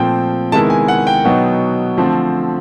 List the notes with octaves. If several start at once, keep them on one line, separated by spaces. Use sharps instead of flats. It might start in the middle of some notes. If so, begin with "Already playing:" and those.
Already playing: A#2 F3 A3 C4 G5
C3 D#3 G#3 B3 E4 A5
G#5
F#5
G5
B2 F#3 B3 D#4
D3 F3 A3 C4